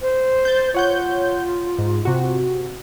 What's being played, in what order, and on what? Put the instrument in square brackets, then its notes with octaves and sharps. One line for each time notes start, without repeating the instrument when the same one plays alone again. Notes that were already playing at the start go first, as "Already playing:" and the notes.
[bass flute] C5
[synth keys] G6 A6
[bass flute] F4 [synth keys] C#5 F#5 G6
[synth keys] G#2
C3 F#4